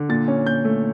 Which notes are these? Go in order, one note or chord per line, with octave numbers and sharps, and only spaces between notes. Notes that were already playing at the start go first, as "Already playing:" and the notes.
Already playing: D3
A#2 A6
C#4
A#2 G6
A3